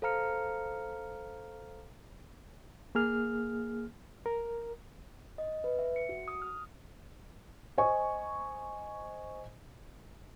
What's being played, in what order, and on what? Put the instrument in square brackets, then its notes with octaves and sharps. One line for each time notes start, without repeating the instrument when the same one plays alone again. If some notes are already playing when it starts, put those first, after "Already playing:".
[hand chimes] A4 C5 F5 A#5 F6 C#7
[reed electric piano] A#3 G#4 F6
A#4
[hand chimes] D#5
B4
E5
C#7
F#4
D#6
F6
[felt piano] C5 D#5 G#5 C#6